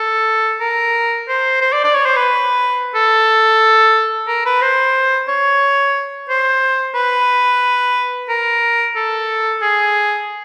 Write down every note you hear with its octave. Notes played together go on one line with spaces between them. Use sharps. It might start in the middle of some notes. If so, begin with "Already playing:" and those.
Already playing: A4
A#4
C5
C5
D5
D5
C#5
C5
B4
A4
A#4
B4
C5
C#5
C5
B4
A#4
A4
G#4